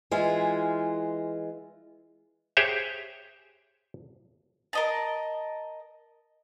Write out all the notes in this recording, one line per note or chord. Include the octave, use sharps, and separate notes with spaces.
E3 G#3 F4
G4 G#4 C5 C#5 E5
A#4 D#5 A5